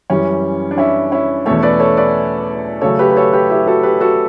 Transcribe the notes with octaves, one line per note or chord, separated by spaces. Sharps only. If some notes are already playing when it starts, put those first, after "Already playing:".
F#2 E3 G3 C#4
D4
C#4 E4
C#4 E4
E2 B2 A3 C#4 A4 C#5
B4 D5
A4 C#5
B4 D5
C#3 F#3 A3 C#4 A4 C#5
G4 B4
B4
A4 C#5
G4 B4
E4 G4
F#4 A4
G4 B4
F#4 A4